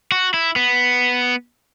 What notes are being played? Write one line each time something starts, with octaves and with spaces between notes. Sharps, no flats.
F#4
E4
B3